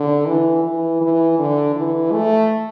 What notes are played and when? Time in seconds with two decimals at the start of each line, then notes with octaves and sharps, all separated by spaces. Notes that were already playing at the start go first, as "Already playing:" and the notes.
Already playing: D3
0.26 E3
0.63 E3
1.01 E3
1.39 D3
1.75 E3
2.13 A3